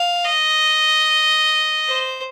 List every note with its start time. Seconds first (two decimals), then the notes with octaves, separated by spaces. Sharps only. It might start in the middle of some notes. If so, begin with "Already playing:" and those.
Already playing: F5
0.25 D#5
1.87 C5